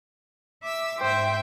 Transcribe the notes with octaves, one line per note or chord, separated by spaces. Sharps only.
E5 D6 E6
G#2 C5 E5 G5